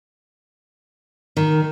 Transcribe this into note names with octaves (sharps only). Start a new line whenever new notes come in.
D#3